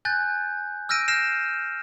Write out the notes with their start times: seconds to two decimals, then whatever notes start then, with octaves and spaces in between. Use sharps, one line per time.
0.05 G#5 F#6 G6 A6
0.89 E6 F6 G6 A#6 D7 D#7
1.08 F6 G6 A#6 C7 E7